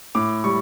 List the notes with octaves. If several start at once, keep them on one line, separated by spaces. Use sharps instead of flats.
A2 D6
G3 C#6